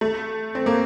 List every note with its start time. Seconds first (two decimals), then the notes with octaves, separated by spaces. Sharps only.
0.01 A3
0.55 C4
0.66 A#3